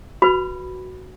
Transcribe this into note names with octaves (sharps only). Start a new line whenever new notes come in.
F#4 B4 B5